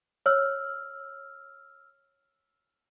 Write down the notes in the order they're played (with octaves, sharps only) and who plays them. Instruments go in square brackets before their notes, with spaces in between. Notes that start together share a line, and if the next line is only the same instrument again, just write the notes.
[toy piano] C#5 [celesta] E6 F6